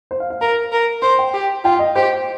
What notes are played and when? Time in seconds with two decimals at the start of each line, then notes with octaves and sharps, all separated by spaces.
0.11 C5
0.20 F5
0.30 F5
0.41 A#4 A#5
0.72 A#4
1.02 C5 C6
1.19 G5
1.34 G4
1.64 F4 G5
1.79 D#5
1.95 G4 C5